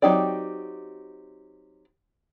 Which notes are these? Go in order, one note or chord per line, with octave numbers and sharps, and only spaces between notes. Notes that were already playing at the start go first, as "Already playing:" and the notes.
F#3 C4 D#4 G4 D5